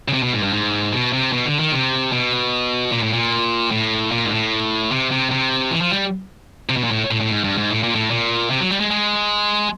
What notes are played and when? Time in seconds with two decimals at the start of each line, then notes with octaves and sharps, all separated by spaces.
0.08 C#3
0.13 C3
0.23 B2
0.33 G#2
0.43 G2
0.53 G#2
0.92 B2
1.13 C3
1.33 B2
1.46 D3
1.59 D#3
1.73 C3
2.12 B2
2.92 A#2
3.03 A2
3.13 A#2
3.71 A2
4.12 A#2
4.25 G#2
4.31 A2
4.92 C3
5.11 C3
5.31 C3
5.71 E3
5.81 F3
5.91 G3
6.69 C3
6.77 B2
6.84 A#2
6.91 A2
7.11 A2
7.21 A2
7.31 G#2
7.44 G2
7.58 G#2
7.71 A2
7.83 A#2
7.95 A2
8.10 A#2
8.50 C3
8.60 F#3
8.71 G3
8.80 G#3
8.91 G#3